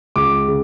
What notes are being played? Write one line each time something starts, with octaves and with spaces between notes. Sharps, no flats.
C#2 D6
C#3